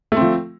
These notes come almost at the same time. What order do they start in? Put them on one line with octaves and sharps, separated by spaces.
A3 C4 F3